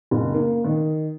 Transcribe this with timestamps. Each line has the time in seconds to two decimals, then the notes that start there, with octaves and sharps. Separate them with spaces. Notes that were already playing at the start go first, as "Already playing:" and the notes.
0.11 F#1
0.34 A#3
0.64 D#3